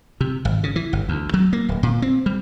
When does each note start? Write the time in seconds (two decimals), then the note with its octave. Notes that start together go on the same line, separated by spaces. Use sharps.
0.21 C3
0.45 G#1
0.64 C#3
0.76 E3
0.93 G1
1.09 D2
1.34 F#3
1.53 A#3
1.69 D1
1.83 A#2
2.02 C4
2.26 G3